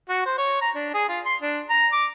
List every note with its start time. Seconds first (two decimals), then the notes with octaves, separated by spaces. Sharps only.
0.09 F#4
0.26 C5
0.38 C#5
0.61 A#5
0.75 D4
0.94 G#4
1.09 F4
1.25 C6
1.41 D4
1.70 A#5
1.92 D6